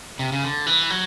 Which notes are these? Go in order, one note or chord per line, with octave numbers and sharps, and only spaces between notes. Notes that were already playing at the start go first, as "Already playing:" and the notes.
C3
C#3
D3
E3
F#3